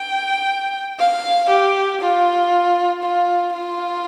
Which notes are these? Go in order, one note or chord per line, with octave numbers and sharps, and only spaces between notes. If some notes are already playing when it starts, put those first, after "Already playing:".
Already playing: G5
F5
G4
F4
F4
F4